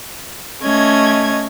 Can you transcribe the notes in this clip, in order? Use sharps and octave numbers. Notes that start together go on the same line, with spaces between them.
A3 C#4 D#5 G#6